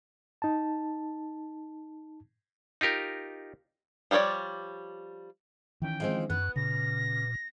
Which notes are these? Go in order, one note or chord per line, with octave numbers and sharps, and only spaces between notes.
D#4 A5
D#4 F4 G4 A#4
F3 G3 G#4 C#5 D5
D#3 E3 C#4 G5
F3 G#3 C4
F#2 B3 F#6
A#2 C#3 A#6